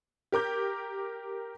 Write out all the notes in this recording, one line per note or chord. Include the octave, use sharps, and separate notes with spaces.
G4 A#4 D6 G6